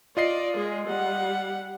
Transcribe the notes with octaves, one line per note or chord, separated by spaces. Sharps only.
F4 D5 D#5 C7
G#3 G#4
G3 F#5